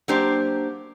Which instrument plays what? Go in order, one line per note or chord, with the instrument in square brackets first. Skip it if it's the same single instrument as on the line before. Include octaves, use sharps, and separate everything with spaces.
[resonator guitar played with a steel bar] F#3 A#3 D4 G4 C5